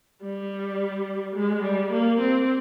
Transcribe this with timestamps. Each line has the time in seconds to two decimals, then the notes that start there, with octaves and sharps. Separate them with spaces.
0.22 G3
1.35 G#3
1.63 G3
1.92 A#3
2.20 C4